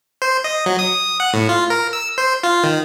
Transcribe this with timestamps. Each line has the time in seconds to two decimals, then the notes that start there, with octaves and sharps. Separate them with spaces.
0.22 C5
0.44 D#5
0.66 F#3
0.79 D#6
1.20 F#5
1.33 A2
1.49 F4
1.70 A#4
1.93 E6
2.18 C5
2.43 F4
2.63 D#3